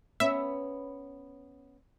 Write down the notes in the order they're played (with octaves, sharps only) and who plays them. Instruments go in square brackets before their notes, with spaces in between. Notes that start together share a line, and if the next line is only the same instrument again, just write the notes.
[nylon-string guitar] B3 C#4 [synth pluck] E5